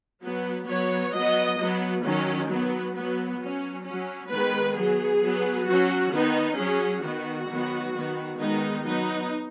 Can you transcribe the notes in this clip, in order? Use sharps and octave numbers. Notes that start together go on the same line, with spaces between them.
F#3 B3
F#3 B3 C#5
F#3 B3 D#5
F#3 B3
D#3 F#3 C#4
F#3 B3
F#3 B3
F#3 C#4
F#3 C#4
D#3 G#3 B3 B4
F#3 B3 G#4
F#3 B3
F#3 C#4 F#4
D#3 B3 D#4
F#3 C#4 G#4
D#3 B3 F#4
D#3 F#3 B3
D#3 B3
D#3 G#3 B3 D#4
F#3 B3 D#4